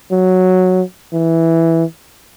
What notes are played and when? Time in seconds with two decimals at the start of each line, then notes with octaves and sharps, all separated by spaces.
0.12 F#3
1.13 E3